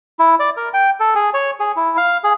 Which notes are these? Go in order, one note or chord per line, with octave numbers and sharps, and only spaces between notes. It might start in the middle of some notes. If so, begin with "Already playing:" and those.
E4
D5
A#4
G5
A4
G#4
C#5
G#4
E4
F5
G#4